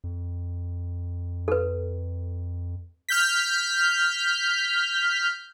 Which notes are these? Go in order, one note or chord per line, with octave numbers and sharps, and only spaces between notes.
F2
A4 B4
F6 G6 B6